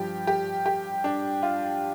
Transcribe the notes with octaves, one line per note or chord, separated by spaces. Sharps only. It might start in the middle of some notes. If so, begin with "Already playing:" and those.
Already playing: G2 F3 G4
G4
G4
D4
F4